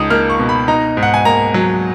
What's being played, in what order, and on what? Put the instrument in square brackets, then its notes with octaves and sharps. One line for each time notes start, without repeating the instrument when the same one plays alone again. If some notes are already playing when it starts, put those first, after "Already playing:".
Already playing: [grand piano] C#2 D#4 D#6
A#3 F6
C#6
B2
B5
D#4 A#5
G#2
F#5
G#5
A#3 A#5
F#3